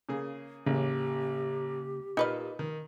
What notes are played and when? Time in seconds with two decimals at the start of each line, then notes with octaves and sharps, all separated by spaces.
0.09 C#3 A#3 G#4
0.66 A1 C#3 A#3 G4
2.17 A#2 D#4 B4 D#5 F6
2.59 D#3